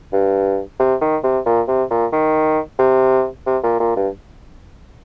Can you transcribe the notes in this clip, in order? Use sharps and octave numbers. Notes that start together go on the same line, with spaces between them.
G2
C3
D#3
C3
A#2
C3
A#2
D#3
C3
C3
A#2
A#2
G2